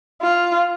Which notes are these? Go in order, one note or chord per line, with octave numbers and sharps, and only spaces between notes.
F4